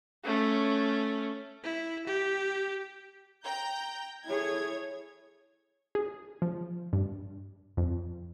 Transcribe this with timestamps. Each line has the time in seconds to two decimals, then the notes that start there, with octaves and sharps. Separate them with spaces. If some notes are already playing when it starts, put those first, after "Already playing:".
0.25 A3 C#4
1.63 E4
2.07 G4
3.44 G5 A#5 G6
4.25 E4 G#4 A4 C#5 G#6
5.95 G#4
6.42 F3
6.93 G2
7.77 F2